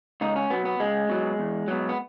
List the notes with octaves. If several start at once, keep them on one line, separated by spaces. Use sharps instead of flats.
C#2 D#4
C#4
B2 F#3 B3
B3
C#2 G#3
B2 F#3
E2
B2 F#3
B3